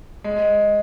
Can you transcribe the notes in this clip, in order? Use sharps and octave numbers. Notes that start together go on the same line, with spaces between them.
G#3